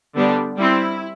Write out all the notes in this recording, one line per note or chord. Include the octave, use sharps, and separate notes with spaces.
D3 G3 B3 D4
G3 C4 E4